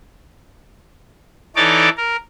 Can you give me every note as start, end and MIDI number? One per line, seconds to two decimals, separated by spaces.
1.56 1.89 52
1.56 1.89 63
1.56 1.89 69
1.56 1.89 73
1.56 1.89 74
1.56 1.89 86
1.97 2.16 70